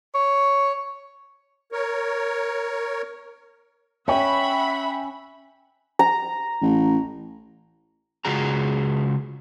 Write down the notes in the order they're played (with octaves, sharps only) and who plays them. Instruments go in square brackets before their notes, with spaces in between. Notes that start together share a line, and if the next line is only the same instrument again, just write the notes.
[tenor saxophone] C#5
[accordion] A#4 C#5
[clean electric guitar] C#4 [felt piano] C#5 G5 [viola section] E5 F#5 B5
[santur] A#5
[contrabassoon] A1
[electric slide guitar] C#3 G#3 F4 F#4 G#4 A#5